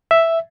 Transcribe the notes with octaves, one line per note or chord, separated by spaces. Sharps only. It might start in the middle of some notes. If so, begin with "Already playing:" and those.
E5